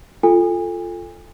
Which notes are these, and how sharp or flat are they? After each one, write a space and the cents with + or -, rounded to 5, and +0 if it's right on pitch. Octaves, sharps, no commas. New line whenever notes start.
F4 +0 A4 -5 G#5 -35